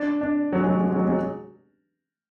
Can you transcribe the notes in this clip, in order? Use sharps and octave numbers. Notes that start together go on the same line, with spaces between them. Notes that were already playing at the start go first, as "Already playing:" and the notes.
Already playing: D4
D4
F#3
G#3
F#3
G#3
F#3
G#3
F#3
G#3
F#3